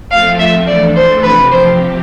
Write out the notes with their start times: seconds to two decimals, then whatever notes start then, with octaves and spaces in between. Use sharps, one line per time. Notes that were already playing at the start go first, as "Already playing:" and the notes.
0.10 F3 A3 C4 F4 A4 F5
0.39 E5
0.67 E3 A3 D4 A4 D5
0.96 C5
1.23 C3 F3 C4 G4 B4
1.52 C5